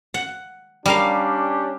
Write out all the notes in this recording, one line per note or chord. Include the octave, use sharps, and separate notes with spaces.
F#5
G3 C#4 D4 G4 A#4 F5